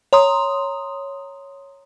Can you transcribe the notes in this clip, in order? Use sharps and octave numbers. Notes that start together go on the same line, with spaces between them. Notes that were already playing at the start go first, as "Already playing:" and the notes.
C#5 A#5 C6 D#6